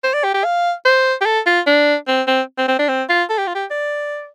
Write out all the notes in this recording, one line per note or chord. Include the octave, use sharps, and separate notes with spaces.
C5
D5
G4
G4
F5
C5
G4
A4
F4
D4
C4
C4
C4
C4
D4
C4
F4
A4
G4
F4
G4
D5